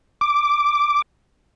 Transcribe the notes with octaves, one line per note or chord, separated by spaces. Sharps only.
D6